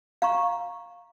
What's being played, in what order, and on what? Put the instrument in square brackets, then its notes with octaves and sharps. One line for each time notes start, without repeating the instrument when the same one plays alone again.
[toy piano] F5 A#5 C#6